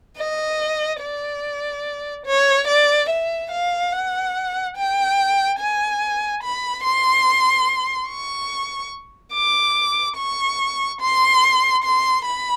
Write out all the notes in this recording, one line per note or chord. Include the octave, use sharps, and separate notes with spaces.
D#5
D5
C#5
D5
E5
F5
F#5
G5
G#5
B5
C6
C#6
D6
C#6
C6
C6
B5